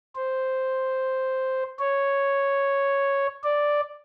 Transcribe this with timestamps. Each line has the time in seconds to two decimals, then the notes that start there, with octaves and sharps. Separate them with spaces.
0.16 C5
1.79 C#5
3.44 D5